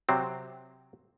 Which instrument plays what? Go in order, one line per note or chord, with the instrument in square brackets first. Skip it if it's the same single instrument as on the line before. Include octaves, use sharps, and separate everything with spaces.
[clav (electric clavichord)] C3 F#3 C4